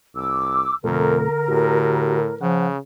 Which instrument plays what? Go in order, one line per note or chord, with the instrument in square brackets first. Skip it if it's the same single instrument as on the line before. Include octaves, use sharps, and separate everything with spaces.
[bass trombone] C2 [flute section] D6 E6
[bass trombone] F2 [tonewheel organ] B2 A3 A4 [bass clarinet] D3 [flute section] A#4
[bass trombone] A2 [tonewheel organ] F#4 G4
[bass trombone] C#3 [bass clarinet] F3 [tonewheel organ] F#5